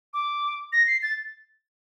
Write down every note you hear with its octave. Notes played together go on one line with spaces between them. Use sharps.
D6
A#6
C7
A6